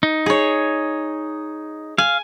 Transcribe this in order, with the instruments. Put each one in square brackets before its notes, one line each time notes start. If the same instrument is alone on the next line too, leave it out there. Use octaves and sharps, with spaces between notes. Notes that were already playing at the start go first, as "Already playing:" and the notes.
[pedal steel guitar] D#4
[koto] G#4 C#5
[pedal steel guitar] F5 [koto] G#5